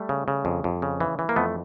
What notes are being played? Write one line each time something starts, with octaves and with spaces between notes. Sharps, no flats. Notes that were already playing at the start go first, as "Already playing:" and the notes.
Already playing: G3 A3
C#3
C#3
F2
F2
C#3
E3
E3
A#3
F2 A3 B3